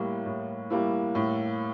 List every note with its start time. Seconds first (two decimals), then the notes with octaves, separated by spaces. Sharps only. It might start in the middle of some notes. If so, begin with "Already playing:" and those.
Already playing: A2 G3 A#3 E4
0.26 A2
0.70 G3 A#3 E4
1.15 A2